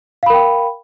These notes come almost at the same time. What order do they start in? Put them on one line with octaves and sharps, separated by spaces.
F5 B5 A#4 G5